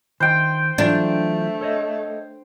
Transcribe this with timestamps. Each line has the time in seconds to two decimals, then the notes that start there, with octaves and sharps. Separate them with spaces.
0.20 D#3 C5 G5
0.78 E3 F#3 A3 D4 F4
1.61 A4 C#5 D#5